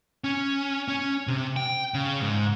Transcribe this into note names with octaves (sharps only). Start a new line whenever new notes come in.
C#4
C#4
C3
G5
C#3
G#2